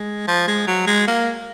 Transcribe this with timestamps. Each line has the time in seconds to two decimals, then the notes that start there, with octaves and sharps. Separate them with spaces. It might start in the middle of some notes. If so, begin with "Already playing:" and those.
Already playing: G#3
0.28 F3
0.48 G#3
0.68 F#3
0.87 G#3
1.08 A#3